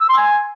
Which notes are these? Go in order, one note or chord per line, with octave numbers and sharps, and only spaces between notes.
E6
C6
G#5